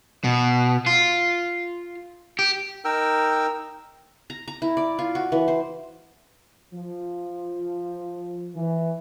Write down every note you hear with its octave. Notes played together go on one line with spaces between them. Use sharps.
B2
F4
G4
D#4 A#4 G5 E6
A#5
A#5
E4
D5
F4
F#4
E3
C5
F3
E3